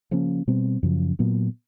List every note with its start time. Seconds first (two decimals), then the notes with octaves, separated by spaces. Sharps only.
0.11 C#3 F3 A#3 C#4
0.47 B2 G3 C4
0.83 F#2 C#3 F3
1.19 A#2 F#3 B3